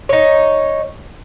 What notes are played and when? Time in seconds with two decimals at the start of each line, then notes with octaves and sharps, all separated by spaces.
0.09 D#4 C#5